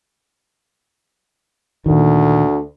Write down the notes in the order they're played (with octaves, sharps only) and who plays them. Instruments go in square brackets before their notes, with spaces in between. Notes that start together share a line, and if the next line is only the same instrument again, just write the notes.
[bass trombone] D2 [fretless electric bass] A#2 D#3